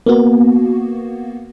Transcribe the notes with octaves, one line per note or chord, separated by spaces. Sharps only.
A#3 B3 F#4